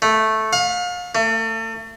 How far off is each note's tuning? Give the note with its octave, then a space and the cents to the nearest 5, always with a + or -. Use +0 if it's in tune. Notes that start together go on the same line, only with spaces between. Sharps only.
A3 -5
F5 +35
A3 +35